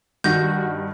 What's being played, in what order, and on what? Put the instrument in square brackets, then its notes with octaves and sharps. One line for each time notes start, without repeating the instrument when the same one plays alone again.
[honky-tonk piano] G2 D#3 A#6 [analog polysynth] F#4 [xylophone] G6